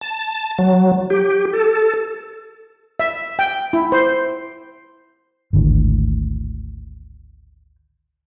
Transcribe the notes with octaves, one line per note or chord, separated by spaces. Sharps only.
A5
F#3
G4
A4
E5
G5
E4
C5
G#1 D2 A2